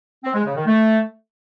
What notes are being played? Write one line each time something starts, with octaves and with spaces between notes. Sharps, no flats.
C4
G#3
C#3
D#3
A3